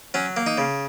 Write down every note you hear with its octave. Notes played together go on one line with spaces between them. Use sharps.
F#3 C#4
A#3
D#4
C#3